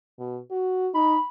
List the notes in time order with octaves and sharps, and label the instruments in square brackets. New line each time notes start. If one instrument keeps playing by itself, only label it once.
[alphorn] B2
F#4
[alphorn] D#4 [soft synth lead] B5